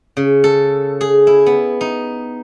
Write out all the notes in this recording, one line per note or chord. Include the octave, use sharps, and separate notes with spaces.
C#3
A4
G#4
E4
B3
D#4